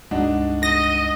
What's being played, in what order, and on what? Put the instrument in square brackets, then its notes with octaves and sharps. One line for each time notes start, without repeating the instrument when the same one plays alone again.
[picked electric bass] C#2 G2 G#3 [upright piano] D4 D#4 F#4
[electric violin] D#5 [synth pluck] A#6